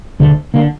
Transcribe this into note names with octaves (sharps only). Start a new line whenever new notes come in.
E1 D2 D3 A3
D3 A#3